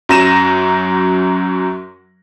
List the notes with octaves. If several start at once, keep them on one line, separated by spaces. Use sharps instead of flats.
F#2 F#3 A#5 A#6 D#7 E7